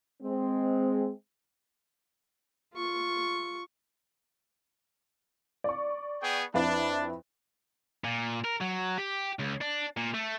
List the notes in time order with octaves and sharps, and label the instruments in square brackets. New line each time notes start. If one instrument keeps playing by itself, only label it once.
[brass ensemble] G#3 C4
[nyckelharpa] F4 C#6
[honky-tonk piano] D5 C#6
[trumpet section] B3 G#4 G5
[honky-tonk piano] F2 E4 B4 [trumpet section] D4
[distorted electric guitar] A#2
A#4
F#3
G4
C#2
D4
A#2
A3